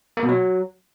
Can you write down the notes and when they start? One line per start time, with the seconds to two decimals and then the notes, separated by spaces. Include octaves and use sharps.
0.17 A#3
0.23 B2
0.29 F#3